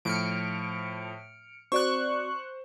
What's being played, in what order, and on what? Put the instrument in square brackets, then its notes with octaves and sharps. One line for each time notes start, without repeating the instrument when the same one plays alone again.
[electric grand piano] A2 F3 [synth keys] F6 C#7 D7
[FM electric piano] C4 F#4 D5 [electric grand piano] C5 [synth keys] C#6 F#6